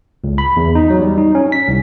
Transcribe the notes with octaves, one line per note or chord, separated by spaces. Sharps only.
C#2
B5
E2
D#4
F#3
G3
D#4
C#4
B6
C2